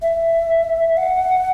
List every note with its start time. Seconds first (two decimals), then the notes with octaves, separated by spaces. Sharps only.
0.02 E5
0.97 F#5